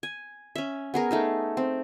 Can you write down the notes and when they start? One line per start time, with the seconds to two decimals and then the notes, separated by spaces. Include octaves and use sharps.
0.03 G#5
0.56 C#4 E5
0.94 B3 G#4 A#4
1.11 A3 D#4 G#4
1.57 C4